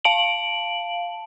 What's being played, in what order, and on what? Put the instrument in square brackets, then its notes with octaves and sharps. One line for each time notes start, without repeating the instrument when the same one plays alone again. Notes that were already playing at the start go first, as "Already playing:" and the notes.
[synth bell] F5 A5 D7 F#7